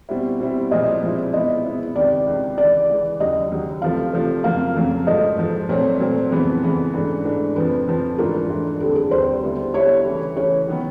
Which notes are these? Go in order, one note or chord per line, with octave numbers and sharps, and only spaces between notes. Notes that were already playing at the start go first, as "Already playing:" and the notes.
B2 G3 C4 E4
B2 G3 C4 E4
A#2 F3 G#3 C4 E4 D#5
A#2 F3 G#3 C4 E4
B2 G#3 B3 E4 D#5
B2 G#3 B3 E4
C#2 C3 D#3 D5
C#2 C3 D#3
C#3 E3 G#3 D5
C#3 E3 G#3
D#2 C#3 F#3 D#5
D#2 C#3 F#3
C3 F3 A3 F5
C3 F3 A3
F2 C#3 F#3 A#3 F5
F2 C#3 F#3 A#3
G#2 F3 A3 D#5
G#2 F3 A3
A#2 F#3 A3 C4 C#5
A#2 F#3 A3 C4
F2 C#3 E3 G#3 B3 C5
F2 C#3 E3 G#3 B3
G#2 E3 A3 D4
G#2 E3 A3 D4
F2 C#3 F3 B4
F2 C#3 F3
G#2 E3 A3 D4 F4 A#4
G#2 E3 A3 D4 F4
D#2 D3 G3 C4 A4
G#4
D#2 D3 G3 C4 C5
D3 G3 B3 E4
D3 G3 B3 E4 C#5
C#3 E3 A3
C#3 E3 A3 C#5
D#3 F#3 B3